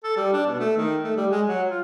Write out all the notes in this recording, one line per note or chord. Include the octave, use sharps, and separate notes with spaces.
A4
G3
D4
B2
A3
D#3
A3
G3
G#3
F#3
F4